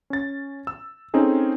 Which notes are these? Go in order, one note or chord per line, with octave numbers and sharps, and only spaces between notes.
C#4 A6
E6
C4 C#4 D#4 G#4 A4